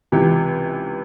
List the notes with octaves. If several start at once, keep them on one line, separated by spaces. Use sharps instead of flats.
C#2 C3 E3 G4